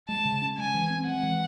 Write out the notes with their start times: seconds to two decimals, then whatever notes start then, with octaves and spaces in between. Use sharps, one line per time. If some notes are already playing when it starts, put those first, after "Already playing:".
0.08 G#3 A5
0.25 C#3
0.42 C#4
0.58 G#3 G#5
0.74 E3
0.90 C4
1.07 G#3 F#5
1.23 E3